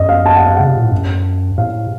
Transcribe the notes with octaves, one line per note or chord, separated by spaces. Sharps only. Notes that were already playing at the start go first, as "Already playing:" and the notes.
Already playing: F#2 D#5
F5
A5
F#5
F5
C#3 F#5
C3
A#2
A2
F#2
A2 F5